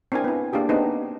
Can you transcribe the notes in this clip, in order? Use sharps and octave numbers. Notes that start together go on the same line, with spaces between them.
C4 D4 E4 A#4 G#5
B3 E4
A#3 D4 F4 G4 G#4
B3 C4 D4 D#4 G#4